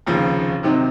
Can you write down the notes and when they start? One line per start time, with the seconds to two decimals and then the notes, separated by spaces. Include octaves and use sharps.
0.06 F1 D#2 C#3 F3
0.63 C3 D#3 F#3 C4 D#4